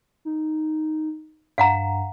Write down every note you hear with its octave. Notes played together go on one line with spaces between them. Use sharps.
D#4
G2 F5 F#5 A#5